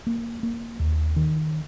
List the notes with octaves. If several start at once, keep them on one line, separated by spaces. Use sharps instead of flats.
A#3
A#3
D#2
D#3